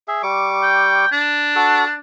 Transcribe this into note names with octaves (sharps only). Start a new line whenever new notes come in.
G#4 E5
G3 C#6 D6
G5
D4
F#4 A4